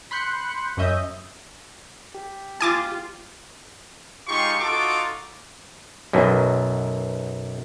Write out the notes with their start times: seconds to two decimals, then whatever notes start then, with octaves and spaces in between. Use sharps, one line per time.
0.11 B5 C6 F#6 G6 C#7
0.77 F#2 C#4 D#5 E5 D#6 G6
2.14 G4
2.61 F4 G#5 D6 A6
4.27 G#3 D#4 F4 G4 C6 C#6
4.60 D#4 F4 F#4 A4 C#6 D6
6.13 B1 F#2 B2